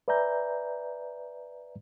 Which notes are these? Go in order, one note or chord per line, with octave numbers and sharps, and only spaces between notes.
B4 D5 E5 G#5 A#5 G6